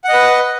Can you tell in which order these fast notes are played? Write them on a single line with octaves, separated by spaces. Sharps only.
F#5 D#5 B4